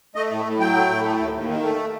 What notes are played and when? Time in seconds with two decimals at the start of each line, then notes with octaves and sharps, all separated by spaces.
0.15 A3 D#5
0.31 A2
0.45 A2
0.59 F#3 G5
0.74 A3
0.89 A2
1.04 A3
1.19 D#2
1.34 D#2
1.48 D#3
1.63 A3